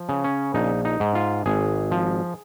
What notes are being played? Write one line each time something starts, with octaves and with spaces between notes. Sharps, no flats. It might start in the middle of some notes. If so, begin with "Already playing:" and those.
Already playing: F3
C#3
C#4
A#1 D#4
D#4
G#2
F4
G#1 G#4
F3